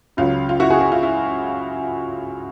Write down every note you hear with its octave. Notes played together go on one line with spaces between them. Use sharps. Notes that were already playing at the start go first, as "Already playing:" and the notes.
C#2 C#3 F#3 F4
F4
E4 F#4
F#4 G#4
F#4 G#4
F4
E4